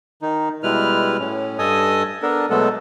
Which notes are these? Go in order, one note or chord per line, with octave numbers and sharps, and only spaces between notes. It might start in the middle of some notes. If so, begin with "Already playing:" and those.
D#3 D#4
B2 G3 G#3 E4 B4 F6
A2 C#4
G2 A4 D#5 G#5 D#6
B3 D4 A4 A#4
B2 F#3 G#3 A3 B3 A4